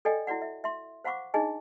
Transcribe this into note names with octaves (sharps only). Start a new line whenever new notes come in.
A4 D5 D#5 G5 G#5
E4 F#4 D5 F#5
E5
E5 C6
C5 F5 F#5 B5 C#6 D6
D4 D#4 G#4 D#5 G#5